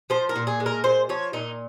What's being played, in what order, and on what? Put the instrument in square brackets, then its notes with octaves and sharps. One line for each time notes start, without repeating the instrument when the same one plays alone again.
[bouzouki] F3 C5
A#4
A#2
G#4
G#3
A#4
A#2 C5
F3 C#5
A#2 D#4